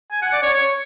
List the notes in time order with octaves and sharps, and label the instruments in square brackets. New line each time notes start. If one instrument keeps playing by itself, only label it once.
[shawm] G#5
F#5
D5
C#5
C#5